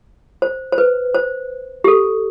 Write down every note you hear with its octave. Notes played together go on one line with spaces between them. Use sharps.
C5
C5
B4
C5
G4
A4